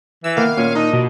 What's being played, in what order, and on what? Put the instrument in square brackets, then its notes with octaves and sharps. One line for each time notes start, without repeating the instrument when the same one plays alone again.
[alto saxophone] E3 [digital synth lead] E6
[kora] D#3 A#3 B3 [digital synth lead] F5
[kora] A#2 [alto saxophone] C#4
[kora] D4 [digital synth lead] D#4 [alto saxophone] D#5
[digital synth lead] B2